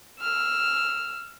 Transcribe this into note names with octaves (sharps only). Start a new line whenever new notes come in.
E6 F6